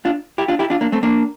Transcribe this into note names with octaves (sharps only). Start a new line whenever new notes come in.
D4 F4
E4 G4
D4 F4
E4 G4
D4 F4
A#3 D4
A3 C4
A#3 D4